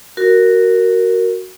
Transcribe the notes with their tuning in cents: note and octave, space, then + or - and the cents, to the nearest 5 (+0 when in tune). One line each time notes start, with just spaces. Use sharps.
F#4 +10 A#4 -10